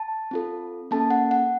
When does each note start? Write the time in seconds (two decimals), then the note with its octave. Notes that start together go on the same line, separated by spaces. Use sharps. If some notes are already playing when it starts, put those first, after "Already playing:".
Already playing: A5
0.31 C4 F4 A4
0.91 A#3 C#4 A4 A5
1.11 F#5
1.31 F#5